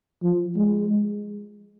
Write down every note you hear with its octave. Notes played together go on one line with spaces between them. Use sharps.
F3
G#3